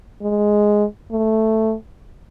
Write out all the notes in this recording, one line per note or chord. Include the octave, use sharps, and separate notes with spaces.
G#3
A3